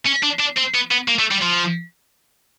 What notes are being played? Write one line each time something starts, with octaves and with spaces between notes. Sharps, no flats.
C#4
D4
D4
C4
B3
B3
A#3
A3
G3
F3